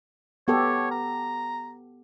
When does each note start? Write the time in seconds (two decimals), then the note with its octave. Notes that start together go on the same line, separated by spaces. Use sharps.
0.48 B3 G4 A4 C#5
0.91 A#5